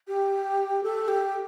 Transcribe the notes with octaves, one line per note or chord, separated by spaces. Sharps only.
G4
A4
G4